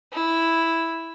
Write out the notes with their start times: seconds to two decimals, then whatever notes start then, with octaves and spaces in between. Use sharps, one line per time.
0.13 E4